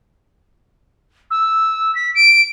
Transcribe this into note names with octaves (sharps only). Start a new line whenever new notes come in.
E6
B6
D7